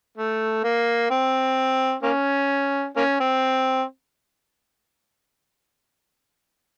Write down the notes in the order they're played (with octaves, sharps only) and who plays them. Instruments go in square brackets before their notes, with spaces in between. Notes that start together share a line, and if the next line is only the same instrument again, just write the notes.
[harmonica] A3
A#3
C4
A#3 C#4
A#3 C#4
C4